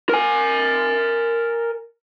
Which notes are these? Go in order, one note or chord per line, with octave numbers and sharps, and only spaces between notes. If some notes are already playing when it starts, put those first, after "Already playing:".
A#4 G#5